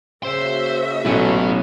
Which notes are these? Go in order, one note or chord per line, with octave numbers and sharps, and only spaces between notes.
C#3 A#3 F#4 C5 E5 C6
A1 B2 F#3 C#4 E4 A4